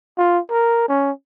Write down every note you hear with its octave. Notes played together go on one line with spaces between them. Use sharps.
F4
A#4
C#4